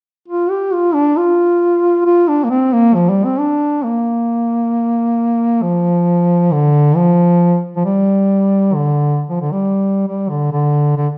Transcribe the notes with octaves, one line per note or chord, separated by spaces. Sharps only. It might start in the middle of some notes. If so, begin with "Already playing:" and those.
F4
G4
F4
D4
F4
F4
D4
A#3
C4
A#3
F3
G3
C4
D4
A#3
F3
D3
F3
F3
G3
D3
F3
D3
G3
G3
D3
D3
D3